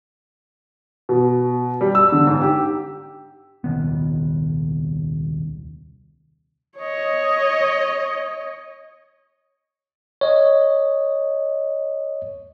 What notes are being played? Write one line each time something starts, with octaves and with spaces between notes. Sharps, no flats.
B2
G3
E6
D3
G#2
G4
D#1 C2 D#3 B3
C#5 D#5
C#5 D#5